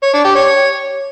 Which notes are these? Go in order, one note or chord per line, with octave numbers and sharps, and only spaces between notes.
C#5
D4
G4
C#5